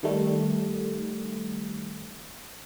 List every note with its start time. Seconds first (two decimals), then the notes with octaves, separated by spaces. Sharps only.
0.03 D#3 G3 A3